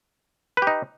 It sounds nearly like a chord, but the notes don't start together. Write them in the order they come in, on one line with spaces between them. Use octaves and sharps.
B4 G4 D#4